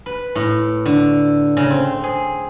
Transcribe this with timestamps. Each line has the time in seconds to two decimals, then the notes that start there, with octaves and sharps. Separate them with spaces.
0.06 B4
0.35 A2
0.86 D3
1.57 C#3
1.70 C4
2.04 G#4